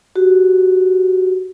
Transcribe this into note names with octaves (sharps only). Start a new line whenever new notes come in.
F#4 G4